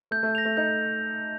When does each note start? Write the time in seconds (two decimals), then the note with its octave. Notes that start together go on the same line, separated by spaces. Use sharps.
0.11 A3 G6
0.23 A3
0.35 A#6 F7
0.45 A3
0.57 D#4 G6